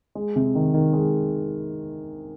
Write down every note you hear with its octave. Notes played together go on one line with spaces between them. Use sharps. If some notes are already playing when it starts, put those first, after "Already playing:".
G#3
C3
D#3
D#3
G#3